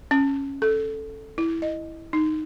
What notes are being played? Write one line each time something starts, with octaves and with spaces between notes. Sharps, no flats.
C#4
A4
E4
D#5
D#4